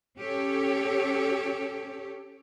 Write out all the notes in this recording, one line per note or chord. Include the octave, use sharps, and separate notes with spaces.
C#4 G4 A4 C#5